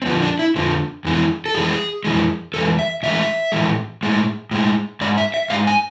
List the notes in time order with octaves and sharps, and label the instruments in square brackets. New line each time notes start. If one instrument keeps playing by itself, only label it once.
[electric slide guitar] C4
F2 D3 F3 B3
D4
E4
F2 D3 F3
F2 E3 G#3
A4
F2 E3 G#3 G#4
F2 E3 G#3
F2 E3 G#3 A4
E5
A2 E3 G#3 E5
A2 E3 G#3
A2 G#3
A2 G#3
G#2 G#3 D5
E5
E5
G#2 G#3 F5
G#5